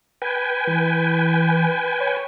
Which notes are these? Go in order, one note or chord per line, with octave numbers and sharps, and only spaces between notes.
B4 G5 G#5
E3
C#5